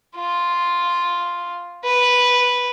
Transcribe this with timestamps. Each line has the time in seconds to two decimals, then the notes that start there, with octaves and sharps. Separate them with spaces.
0.16 F4
1.85 B4